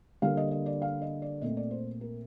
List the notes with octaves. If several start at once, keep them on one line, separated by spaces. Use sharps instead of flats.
D3 G3 A#3 F5
D#5
D#5
D5
F5
D#5
D5
A#2 A3 C4 D#5
D5
C5
A#4